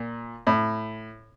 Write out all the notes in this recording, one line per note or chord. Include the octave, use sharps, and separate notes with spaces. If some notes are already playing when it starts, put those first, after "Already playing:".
Already playing: A#2
A2